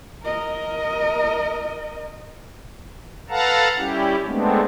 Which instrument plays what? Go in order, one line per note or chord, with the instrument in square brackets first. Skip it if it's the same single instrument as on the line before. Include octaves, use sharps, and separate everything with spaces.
[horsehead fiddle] A#4 D#5
[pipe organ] A4 B4 F5 F#5 A5 A#5
G3 C#4 E4 G4
G#3 A3 B3 C4 D4